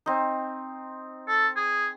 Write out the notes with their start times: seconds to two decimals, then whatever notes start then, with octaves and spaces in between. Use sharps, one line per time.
0.06 C4 D#4
1.28 A4
1.56 G#4